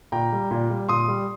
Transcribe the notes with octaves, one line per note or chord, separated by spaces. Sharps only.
A#2 G5 A#5
G3
A#2
G3
A#2 C6 D#6
G3